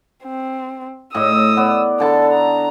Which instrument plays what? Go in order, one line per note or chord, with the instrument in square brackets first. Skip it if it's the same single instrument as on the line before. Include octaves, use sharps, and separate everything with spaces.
[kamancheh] C4
[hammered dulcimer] A2 D#5 [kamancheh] D#6 E6
[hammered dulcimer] B3 D5
[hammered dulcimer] D3 A5 B5 [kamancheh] A4
[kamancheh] A#5